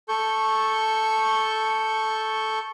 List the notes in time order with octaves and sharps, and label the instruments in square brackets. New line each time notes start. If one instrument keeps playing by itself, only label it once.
[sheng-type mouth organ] A4 C#6 G6